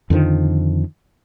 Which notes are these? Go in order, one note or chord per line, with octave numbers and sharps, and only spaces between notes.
F2 D3 D#3 F3